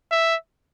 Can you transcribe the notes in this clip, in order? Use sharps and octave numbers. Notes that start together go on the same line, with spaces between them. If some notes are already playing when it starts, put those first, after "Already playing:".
E5